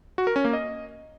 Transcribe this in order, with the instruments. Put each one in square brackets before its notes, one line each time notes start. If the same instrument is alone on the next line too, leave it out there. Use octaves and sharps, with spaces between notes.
[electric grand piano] F#4
A#4
C#4
A#3
D#5